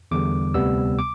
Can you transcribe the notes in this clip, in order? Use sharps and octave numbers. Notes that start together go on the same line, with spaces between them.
E2 D3 G3 D6
D2 C3 G3 B3 E6
D6